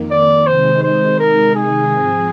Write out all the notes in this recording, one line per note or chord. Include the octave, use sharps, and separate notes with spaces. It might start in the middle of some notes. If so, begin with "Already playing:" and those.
Already playing: F2 D#3 A#3
D5
C3 D#3 G#3 D#4 C5
C5
A#4
G#4
G#2 F3 G#3 C4